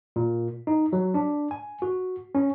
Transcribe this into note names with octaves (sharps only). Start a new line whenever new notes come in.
A#2
D#4
F#3
D4
G#5
F#4
C#4